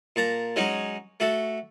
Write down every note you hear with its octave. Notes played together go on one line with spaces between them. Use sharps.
A#2 A5 A#5
F#3 G#3 C#4 D#4
A3 F#4 A4